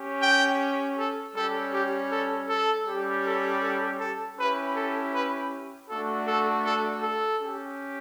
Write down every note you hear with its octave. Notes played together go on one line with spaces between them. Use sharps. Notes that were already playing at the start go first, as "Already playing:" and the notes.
Already playing: C#4 G4
G5
A4
G3 C#4 G4 A4
G4
A4
A4
G3 C#4 G4
A4
A4
A4
C#4 E4 G4 B4
A4
B4
A3 D4 F#4 A4
A4
A4
A4
C#4 G4